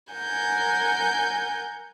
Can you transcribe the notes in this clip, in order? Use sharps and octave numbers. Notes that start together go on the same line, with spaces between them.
A#4 F#5 G#5 G6